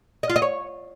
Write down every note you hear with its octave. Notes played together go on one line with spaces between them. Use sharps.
D#5
F4
D#5
C#5